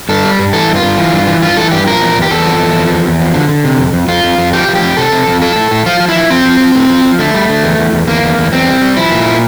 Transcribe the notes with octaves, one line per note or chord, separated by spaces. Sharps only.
G2 A4
G3
G2
E3 A4
G2
F4
G2
E3
G2
E3
G2 F4
E3 A4
G2 G4
F3 A#4
E2
E2
G4
E2 A4
F3
E2
F3
E2
E2
F3
D3
D3
C3
F2
F2
F2 F4
F2
F2
F3 G4
F3
G4
F2
C3 A4
C3
F2
F3 A4
A2
A2
F3 F4
F3
E4
F3
F3 C4
F3
F3
A2
F3
F3
D3 A3
G3
D3
E2
E2
E2
E2 A#3
E2
E2
E2 C4
G3
G3
F3 E4
A#2
F3